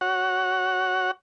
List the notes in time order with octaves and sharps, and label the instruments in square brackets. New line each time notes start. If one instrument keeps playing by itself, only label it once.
[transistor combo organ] F#4 C#5 F#5